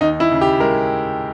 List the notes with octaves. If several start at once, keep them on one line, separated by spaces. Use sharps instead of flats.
D#2 D#4
E4
C#3
G4
G#3 A#4